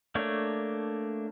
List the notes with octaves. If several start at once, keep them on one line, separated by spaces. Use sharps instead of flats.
A3 A#3 D4 C#5